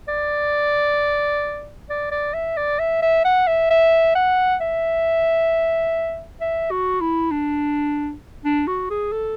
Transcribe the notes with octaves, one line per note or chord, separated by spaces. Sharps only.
D5
D5
D5
E5
D5
E5
E5
F#5
E5
E5
F#5
E5
E5
F#4
E4
D4
D4
F#4
G#4
A4